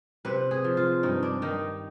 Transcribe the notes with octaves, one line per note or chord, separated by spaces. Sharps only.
C3 B4
G#4
F3
F4
G2 D#4
D4
D#3 D#4